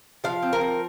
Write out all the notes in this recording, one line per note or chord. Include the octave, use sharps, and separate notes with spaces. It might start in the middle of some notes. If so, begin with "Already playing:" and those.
F3 F5
C4
A#4
F3